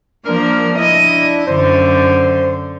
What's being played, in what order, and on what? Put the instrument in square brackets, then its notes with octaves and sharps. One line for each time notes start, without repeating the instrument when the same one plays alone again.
[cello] F3 A#3 [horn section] D4 A#4
[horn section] D4 E4 [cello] D#5
[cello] F#2 D3 [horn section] C5